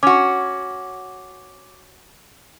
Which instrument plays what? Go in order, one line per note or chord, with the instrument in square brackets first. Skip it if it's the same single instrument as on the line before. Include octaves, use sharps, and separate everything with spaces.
[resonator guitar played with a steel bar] C#4 F#4 [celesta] D6